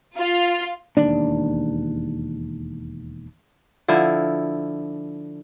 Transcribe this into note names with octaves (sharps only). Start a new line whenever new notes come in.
F4
E1 D#2 D4
D3 F3 E4